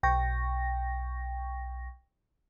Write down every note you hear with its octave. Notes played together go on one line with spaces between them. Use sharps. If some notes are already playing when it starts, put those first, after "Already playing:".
B1 G5 C#6 A#6